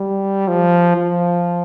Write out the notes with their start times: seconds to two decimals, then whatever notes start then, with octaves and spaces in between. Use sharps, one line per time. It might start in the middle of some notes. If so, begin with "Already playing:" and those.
Already playing: G3
0.48 F3
0.96 F3